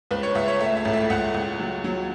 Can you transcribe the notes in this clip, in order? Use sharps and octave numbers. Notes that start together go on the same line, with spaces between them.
C#2 B4
C#5
C#2 E5
C#5
A3 E5
E5
A1
E5
C#2 F#5
C#2
F#3
F#3